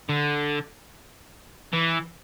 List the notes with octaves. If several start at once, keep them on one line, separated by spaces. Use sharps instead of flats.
D3
E3